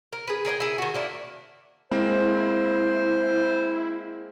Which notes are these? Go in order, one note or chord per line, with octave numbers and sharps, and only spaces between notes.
A#4
G#4 B4
G#4 A#4 D5 G5
E4 G#4
D#3 F#4
A#3 D4 E4
G#3 A#3 C4 E4 C5